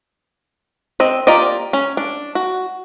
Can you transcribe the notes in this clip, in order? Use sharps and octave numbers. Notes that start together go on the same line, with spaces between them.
C4 D#5
A#3 F4 G4 D5 D#5
C#4
D4
F#4